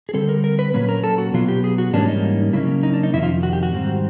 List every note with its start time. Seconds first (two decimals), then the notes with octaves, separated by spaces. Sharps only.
0.09 G#4
0.14 D3 G3 C4 A4
0.29 A#4
0.44 A#4
0.59 B4
0.74 A#2 F#3 A#3 C#4 B4
0.89 A#4
1.04 A4
1.18 F#4
1.34 B2 F#3 B3 F4
1.48 G4
1.64 G#4
1.78 F#4
1.93 G#2 E3 G3 A#3 C#4 D4
2.08 D#4
2.53 C#3 F#3 A#3 C#4 E4
2.83 D#4
2.93 D4
3.03 D#4
3.13 F2 C3 D#3 E4
3.23 F4
3.43 F#4
3.53 G4
3.63 F#4
3.73 G#2 D#3 G3 C4